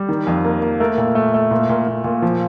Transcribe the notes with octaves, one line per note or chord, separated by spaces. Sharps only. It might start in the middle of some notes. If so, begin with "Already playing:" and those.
Already playing: G3
D#3
F2
A#3
A#3
A3 A#4
A#2
A3
A3
A#2
A#2
A#2
A#2
F3